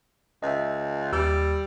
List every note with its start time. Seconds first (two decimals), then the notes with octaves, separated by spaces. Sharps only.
0.43 C#2 D#5 E5
1.12 D#2 G3 E6